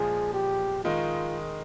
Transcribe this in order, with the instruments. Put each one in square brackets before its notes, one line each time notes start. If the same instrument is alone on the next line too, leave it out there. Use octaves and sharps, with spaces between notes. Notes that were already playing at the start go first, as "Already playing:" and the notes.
Already playing: [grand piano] A#2 F3 G#3 [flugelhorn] G#4
[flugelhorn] G4
[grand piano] D#3 G#3 D#4 [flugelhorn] F4